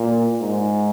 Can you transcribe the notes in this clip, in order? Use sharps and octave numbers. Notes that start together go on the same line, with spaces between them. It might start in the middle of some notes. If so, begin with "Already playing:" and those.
Already playing: A#2
G#2